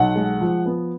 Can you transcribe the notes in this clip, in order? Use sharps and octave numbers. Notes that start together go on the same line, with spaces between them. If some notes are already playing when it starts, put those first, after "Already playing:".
Already playing: B1 F#5
G#3
F3
B3